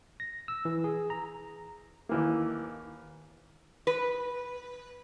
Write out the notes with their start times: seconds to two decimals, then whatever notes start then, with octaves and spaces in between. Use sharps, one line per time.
0.20 A#6
0.48 E6
0.65 E3
0.84 G#4
1.10 A#5
2.09 D#2 E3 A#3
3.87 B4